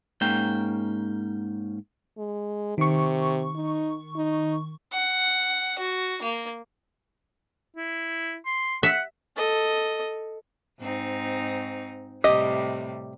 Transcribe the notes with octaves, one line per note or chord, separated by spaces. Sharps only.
G#2 A#3 C#4 G5
G#3
C3 D#3 C#6
D#4
D#4
F#5
F#4
A#3
E4
C6
E5 F#5
A4 D#5
G#2 C4 D#4
A2 C3 G3 G4 D#5